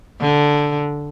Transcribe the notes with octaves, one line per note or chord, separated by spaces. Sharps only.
D3